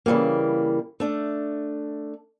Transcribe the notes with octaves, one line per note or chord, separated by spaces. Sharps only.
C#3 E3 F#3 G3 A#3
A3 D4